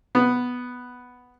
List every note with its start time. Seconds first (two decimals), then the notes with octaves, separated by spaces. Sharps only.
0.15 B3